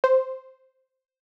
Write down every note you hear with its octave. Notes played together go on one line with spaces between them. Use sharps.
C5